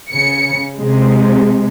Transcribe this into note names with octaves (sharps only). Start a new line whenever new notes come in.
C#3 C#7
C3 G#3